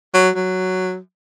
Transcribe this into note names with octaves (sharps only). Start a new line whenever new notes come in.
F#3
F#3